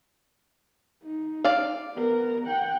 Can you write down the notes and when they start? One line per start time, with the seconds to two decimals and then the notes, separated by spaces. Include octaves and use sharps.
1.03 D#4
1.44 D5 F5
1.93 B3 A#4
2.47 F#5 G5